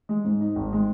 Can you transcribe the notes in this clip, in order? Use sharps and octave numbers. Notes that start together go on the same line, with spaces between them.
G#3
G#2
D#4
G#1
G#3